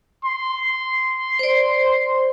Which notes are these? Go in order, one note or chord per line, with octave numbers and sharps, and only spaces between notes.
C6
C5 D5